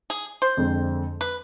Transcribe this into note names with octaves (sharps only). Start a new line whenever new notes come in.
G#4
C5
F2 D3 G#3 C4
B4